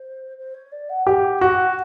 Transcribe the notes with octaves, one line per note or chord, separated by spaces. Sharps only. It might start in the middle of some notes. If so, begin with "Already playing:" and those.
Already playing: C5
C5
C#5
D5
F#5
G4 F#5
F#4